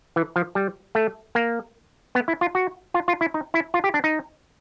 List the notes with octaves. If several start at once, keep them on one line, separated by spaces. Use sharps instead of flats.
E3
F3
G3
A3
A#3
B3
E4
F4
F#4
F4
F4
E4
D#4
E4
F4
G4
D4
D#4